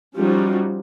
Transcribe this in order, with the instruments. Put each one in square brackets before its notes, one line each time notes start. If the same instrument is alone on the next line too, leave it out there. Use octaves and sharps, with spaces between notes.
[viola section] F3 G3 C#4 D#4 F4 F#4